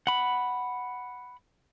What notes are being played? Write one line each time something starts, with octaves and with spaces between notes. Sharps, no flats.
F#5 B5